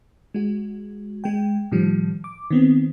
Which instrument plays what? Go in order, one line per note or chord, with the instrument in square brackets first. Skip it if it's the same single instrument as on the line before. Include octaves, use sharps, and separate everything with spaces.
[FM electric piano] G#3 F#4
G#3 G5
A2 D#3 F3 G3
D6
D#3 B3 C4